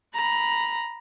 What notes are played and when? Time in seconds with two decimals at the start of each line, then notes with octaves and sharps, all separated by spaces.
0.14 A#5 B5